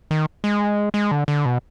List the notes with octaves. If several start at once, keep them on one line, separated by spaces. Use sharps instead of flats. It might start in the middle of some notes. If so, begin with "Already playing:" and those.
D#3
G#3
G#3
D3
D3
B2